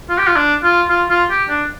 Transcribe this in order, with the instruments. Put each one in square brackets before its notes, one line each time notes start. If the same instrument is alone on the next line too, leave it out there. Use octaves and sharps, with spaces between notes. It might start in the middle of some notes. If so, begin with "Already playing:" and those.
[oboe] F4
G4
F4
D4
F4
F4
F4
G4
D4